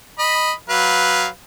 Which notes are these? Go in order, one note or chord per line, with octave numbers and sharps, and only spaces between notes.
D#5 B5
F#3 B4 F5